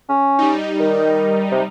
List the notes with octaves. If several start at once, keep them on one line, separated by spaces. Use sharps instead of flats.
C#4
G3 D#4
D#3
C3